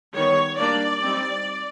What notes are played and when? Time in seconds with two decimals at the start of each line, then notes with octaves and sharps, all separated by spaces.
0.16 D#3 G3 B3 C#5
0.59 G3 A#3 D4 D5
1.03 G3 C4 D#4